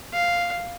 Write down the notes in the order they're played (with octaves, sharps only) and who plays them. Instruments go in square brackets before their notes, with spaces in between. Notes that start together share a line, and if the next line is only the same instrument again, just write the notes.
[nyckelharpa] F5